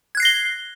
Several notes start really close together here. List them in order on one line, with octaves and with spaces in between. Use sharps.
G#6 F#6 C7 A#6 G7